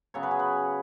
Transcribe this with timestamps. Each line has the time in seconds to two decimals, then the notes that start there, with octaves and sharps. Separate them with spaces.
0.14 C#3 F#3 B3 C#5
0.23 B4
0.31 G#4
0.39 B4